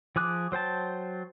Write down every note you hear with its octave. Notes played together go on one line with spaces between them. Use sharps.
F3 G#4 D6 F#6
F#3 C5 G5 A5